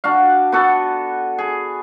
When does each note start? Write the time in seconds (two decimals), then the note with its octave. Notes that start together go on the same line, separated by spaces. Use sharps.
0.04 D4 F#4 F5
0.52 B3 F#4 A4
1.38 G#4